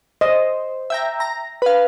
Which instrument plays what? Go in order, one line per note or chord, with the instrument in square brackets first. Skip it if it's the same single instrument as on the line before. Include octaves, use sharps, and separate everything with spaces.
[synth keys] C5 [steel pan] D#5
[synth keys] E5 G5 A#5
A#5
B4 F5